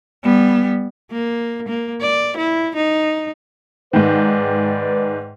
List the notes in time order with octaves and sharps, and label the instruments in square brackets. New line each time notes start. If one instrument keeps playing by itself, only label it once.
[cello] G3 B3
[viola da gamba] A#3
A#3
D5
E4
D#4
[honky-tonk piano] G#2 D#3 [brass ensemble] G#3 B4 D5